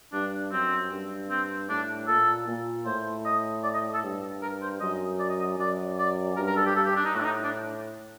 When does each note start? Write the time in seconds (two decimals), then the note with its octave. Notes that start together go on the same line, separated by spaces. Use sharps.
0.13 G2 D4
0.52 F#2 C4
0.91 G2
1.30 C4
1.69 A2 D4
2.08 A#2 A4
2.48 A#2
2.86 A2 C5
3.25 D#5
3.63 D5
3.74 D#5
3.94 A4
4.04 G2
4.42 A#4
4.62 C5
4.80 F#2 D#5
5.19 D5
5.29 D#5
5.40 D#5
5.58 F#2 D5
5.98 D5
6.36 G2 A#4
6.47 A#4
6.56 A4
6.66 G4
6.75 G2 A4
6.86 G4
6.96 D4
7.05 D#4
7.15 A2 F#4
7.20 D4
7.25 D#4
7.44 D4